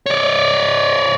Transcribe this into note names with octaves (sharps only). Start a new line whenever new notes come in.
C#5 D5